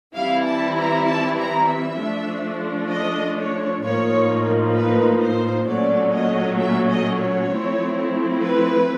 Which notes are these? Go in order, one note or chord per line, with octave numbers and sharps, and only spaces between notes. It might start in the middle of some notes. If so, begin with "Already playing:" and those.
E3 G3 C4 E4 F5
A5
A#5
A5
A#5
E5
F3 A3 D4
D#5
C#5
A2 F3 A#3 D#4 C#5
B4
C5
A#2 F#3 A3 C#4 D5
D#5
E5
D#5
C#5
F3 A3 C4 E4
B4